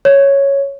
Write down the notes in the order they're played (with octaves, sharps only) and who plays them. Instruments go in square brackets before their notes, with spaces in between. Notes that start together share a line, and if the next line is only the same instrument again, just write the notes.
[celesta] C#5